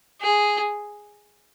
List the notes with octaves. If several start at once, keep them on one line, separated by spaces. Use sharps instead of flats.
G#4